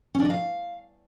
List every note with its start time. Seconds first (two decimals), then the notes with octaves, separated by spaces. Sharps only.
0.15 C#4
0.20 D4
0.25 D#5
0.30 F5